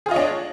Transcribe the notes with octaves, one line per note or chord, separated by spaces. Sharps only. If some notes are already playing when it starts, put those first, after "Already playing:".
D4 F4 G#4 C#5 D#5